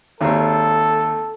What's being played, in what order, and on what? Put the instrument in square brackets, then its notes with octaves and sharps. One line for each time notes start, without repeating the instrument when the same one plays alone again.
[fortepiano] G#1 D#2 [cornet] A4